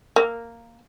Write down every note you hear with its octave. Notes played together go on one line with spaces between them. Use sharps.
A#3